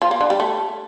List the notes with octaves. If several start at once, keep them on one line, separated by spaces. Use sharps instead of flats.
F3
A#3
D3
G3
A3